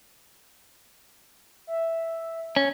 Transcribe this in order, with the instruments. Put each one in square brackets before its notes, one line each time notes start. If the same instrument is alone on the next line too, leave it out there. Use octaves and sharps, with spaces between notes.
[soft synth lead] E5
[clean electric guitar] C#4